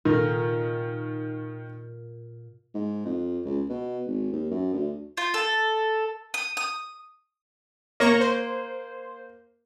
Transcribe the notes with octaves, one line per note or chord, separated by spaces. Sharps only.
A#2 D#3 A#4
G#2
F2
C#2
B2
G#1
D#2
F#2
D2
F4
A4
D#6
D#6
A#3 C#5 A#5 C#6
C5